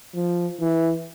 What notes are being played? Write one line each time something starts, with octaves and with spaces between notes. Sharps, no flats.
F3
E3